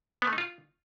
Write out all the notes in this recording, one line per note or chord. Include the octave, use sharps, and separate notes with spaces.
B3
A3
D#4
F4